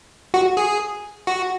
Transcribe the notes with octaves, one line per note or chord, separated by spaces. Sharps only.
F#4
G#4
F#4